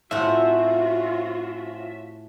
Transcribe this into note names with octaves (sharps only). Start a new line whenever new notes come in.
A2 C4 C#4 F4 F#4 E5 F#5